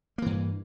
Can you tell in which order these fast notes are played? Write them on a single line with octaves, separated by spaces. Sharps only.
A#3 E3 G2